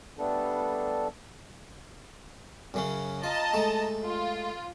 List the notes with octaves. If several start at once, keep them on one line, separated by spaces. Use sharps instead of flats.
G3 A3 B3 D4 A4
F#2 C#3 C#4
F4 D#5 A5 A#5
G#3 A3
F4